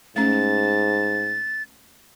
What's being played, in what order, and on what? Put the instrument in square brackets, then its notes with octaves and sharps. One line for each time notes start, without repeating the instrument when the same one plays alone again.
[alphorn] G#2 [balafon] A3 C#4 [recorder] A6